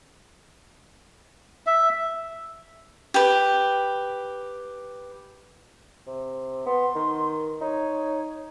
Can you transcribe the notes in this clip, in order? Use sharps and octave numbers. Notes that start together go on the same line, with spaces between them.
E5
G4 B4
C3
B3 C6
D#3
D#4 C#5